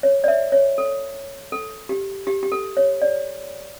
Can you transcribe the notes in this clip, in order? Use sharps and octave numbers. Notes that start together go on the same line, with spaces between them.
C#5
D5
E5
C#5
A4
A4
G4
G4
G4
A4
C#5
D5